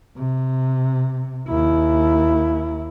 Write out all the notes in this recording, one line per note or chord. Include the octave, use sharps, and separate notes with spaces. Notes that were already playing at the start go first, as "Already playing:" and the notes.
C3
D#2 E4